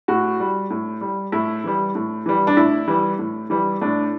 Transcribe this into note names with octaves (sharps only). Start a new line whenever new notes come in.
A2 F#4
G3
A2
G3
A2 E4
E3 G3
A2
E3 G3
D4
A2 E4
E3 G3
A2
E3 G3
A2 D4